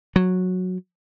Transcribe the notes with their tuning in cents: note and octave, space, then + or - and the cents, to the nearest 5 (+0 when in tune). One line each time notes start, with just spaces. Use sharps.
F#3 -10